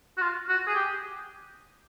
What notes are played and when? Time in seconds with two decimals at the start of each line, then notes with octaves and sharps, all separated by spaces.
0.17 F#4
0.22 F4
0.49 F#4
0.67 G#4
0.75 G4